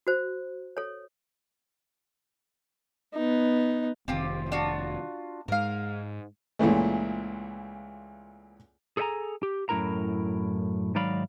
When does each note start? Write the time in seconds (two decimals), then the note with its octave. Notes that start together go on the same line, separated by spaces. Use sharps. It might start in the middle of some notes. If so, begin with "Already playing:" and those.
0.07 F#4 C5
0.77 A4 C#5
3.14 B3 D#4
4.08 F1 D#3 C4 F4 G4
4.52 D4 F4 F#4
5.48 G#2 G#3 A#4 F5
6.59 C#2 A#2 E3 A3
8.97 G#4 A4 C#5 E5 G#5 A#5
9.43 G4
9.69 F#2 A2 E4 A#4 A#5
10.95 G#2 D#3 F#3 D5 F5 B5